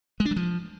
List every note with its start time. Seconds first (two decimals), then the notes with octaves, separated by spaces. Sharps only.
0.20 G#3
0.25 D4
0.31 F#3
0.36 F3